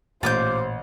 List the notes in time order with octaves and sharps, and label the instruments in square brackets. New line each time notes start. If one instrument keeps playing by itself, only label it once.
[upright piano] A1 [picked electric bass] A#2 [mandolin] F4 D6 G6 [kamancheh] C5